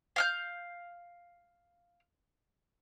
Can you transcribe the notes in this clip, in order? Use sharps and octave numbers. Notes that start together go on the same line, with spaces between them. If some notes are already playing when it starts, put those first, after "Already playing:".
F5 F6 G6